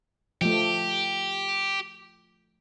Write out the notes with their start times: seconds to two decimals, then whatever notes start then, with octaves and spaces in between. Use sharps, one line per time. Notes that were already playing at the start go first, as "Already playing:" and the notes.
0.41 F3 A3 G4